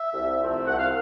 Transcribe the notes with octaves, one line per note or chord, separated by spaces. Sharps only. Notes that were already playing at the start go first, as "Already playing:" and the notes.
Already playing: E5
C2
C3 F3 A3 C4
C2 F#5
F5